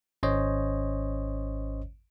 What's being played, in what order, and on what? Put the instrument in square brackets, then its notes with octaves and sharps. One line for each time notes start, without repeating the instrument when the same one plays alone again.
[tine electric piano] G#1 C#4 C5 C#5 D#5